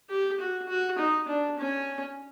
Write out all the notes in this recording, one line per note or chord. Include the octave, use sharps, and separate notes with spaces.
G4
F#4
F#4
D#4
D4
C#4